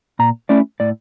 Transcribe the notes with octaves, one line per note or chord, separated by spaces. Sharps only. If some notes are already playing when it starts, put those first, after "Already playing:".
A#2 A#5
A3 C#4 E4 D5
A2 D5